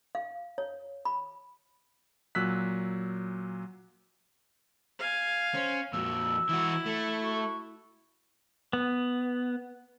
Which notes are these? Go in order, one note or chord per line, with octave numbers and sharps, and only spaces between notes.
F5
C#5
B5
A#2 F#3 E6 F#6 B6
F5 G#5
C#4 C5
F2 A#2 F#4 E6
E3 E4 F#4
A3
F#4
B3